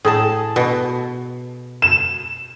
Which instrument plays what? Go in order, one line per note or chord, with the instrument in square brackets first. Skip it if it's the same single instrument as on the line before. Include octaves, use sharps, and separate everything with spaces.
[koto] A2 [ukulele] G#4 A4 A5
[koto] B2
[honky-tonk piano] E7